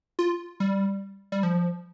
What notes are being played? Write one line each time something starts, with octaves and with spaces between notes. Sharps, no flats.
F4
G3
G3
F3